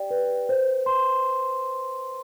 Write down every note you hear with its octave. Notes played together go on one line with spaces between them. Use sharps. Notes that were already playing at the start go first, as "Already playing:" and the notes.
Already playing: G4 D5 G5
B4
C5
C6